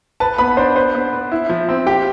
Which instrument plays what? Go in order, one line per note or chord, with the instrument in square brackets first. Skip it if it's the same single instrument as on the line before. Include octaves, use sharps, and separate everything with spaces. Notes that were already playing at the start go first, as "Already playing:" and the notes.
[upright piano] B4 [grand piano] A5
[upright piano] B3 [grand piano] B5
[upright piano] D4 [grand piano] C5
[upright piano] B4 [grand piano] C5
[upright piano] B3
B4
E4
F3
C4
[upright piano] G4 [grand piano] G5